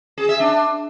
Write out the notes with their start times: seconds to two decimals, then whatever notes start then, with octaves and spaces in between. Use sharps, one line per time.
0.18 G#4
0.29 E5
0.40 D4